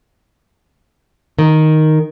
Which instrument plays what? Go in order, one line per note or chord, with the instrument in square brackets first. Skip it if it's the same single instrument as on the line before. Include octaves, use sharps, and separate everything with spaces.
[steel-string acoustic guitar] D#3